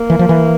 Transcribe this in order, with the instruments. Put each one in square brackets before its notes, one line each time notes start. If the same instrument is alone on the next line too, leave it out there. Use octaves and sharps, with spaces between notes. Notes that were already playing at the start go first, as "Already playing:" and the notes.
Already playing: [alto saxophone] A#3
[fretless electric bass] E3
F3
E3